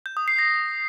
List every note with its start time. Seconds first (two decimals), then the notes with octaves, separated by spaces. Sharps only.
0.06 G6
0.17 D#6
0.28 C7
0.39 A#6